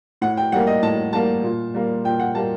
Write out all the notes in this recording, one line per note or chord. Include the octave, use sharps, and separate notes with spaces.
A2 F#5
G5
G3 A#3 F#5
D#5
A2 A5
G3 A#3 A5
A#2
G3 A#3
A#2 G5
F#5
G3 A#3 A5